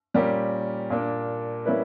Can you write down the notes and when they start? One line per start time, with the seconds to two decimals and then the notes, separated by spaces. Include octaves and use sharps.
0.14 A#2 G3 C#4 G4 A#4
0.90 A#2 A#3 D4
1.65 G3 A#3 C#4 E4 B4